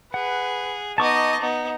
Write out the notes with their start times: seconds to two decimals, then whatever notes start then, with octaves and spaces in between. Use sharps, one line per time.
0.14 G#4 B4 F#5
0.98 B3 D#4 D#5 A5 C#6 D6
1.41 B3 D#4